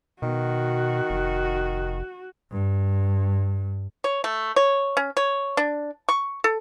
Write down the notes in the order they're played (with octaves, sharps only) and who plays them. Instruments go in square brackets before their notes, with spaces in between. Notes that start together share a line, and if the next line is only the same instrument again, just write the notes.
[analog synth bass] B2 [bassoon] D#3 [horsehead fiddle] F#4
[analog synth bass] F1
[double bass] G2
[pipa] C#5
A3
C#5
C#4
C#5
D4
C#6
A4